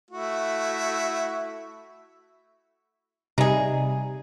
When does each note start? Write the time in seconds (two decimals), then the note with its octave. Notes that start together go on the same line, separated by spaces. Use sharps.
0.11 A3 E4 F#4
3.38 C3 G3 D#4 G#4